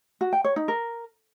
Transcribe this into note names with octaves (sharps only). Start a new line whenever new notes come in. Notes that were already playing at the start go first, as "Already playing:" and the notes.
F#4
G5
C#5
D#4
A#4